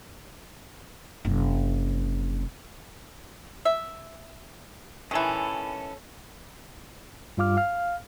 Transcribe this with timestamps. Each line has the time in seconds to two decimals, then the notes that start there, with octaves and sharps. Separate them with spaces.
1.25 F#1 C3
3.65 E5
5.11 D#3 E3 C#4 A4
7.37 G2 G3 F4 F5 D6 F6
7.57 F5 F6